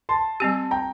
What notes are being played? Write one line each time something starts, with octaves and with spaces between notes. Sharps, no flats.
A5 C6
G3 C4 G4
G5 A#5